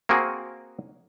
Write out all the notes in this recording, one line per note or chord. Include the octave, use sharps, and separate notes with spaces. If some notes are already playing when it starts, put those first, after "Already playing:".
A#3 C4 F#4 G#4 A#4